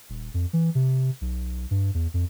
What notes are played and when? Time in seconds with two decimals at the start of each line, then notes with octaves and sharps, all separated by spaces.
0.10 D#1
0.34 F2
0.53 E3
0.75 C3
1.21 B1
1.71 G2
1.94 E2
2.14 F2